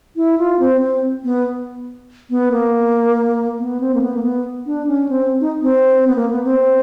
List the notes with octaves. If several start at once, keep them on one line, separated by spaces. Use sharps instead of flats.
E4
F4
C4
C4
B3
B3
A#3
B3
C4
A#3
B3
A#3
B3
D4
C#4
C4
D#4
C4
B3
A#3
B3
C4